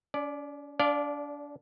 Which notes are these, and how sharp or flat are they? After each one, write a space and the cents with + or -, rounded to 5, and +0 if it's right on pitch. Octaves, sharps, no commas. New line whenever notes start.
C#4 +45 D5 +5
D4 -30 D5 +0 F5 +0